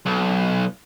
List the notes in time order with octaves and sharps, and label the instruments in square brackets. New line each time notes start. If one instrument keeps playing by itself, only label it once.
[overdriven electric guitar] B1